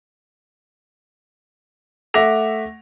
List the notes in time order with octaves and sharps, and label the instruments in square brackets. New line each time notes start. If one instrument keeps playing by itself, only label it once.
[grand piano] A3 E5 F#5 D6 A#6 F7